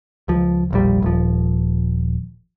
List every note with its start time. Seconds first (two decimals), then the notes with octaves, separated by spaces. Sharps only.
0.28 C#2 F3
0.71 E1 A#1 G3
1.02 D#1 F3